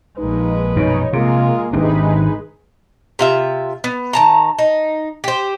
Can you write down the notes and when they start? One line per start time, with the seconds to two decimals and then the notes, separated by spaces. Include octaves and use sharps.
0.18 A#1 G#3 D#4 B4
0.76 F#2 B2 D#4 C#5
1.13 C3 G#3 A#3 F4 G#4 A#4
1.73 G#1 C3 G#3 D4 D#4 G#4 B4
3.19 C3 F4 E5
3.84 B3
4.13 D#3 A5 A#5
4.58 D#4
5.24 G4 C5